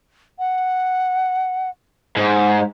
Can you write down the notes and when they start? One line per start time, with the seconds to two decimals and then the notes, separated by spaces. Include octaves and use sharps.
0.39 F#5
2.17 G#2 C5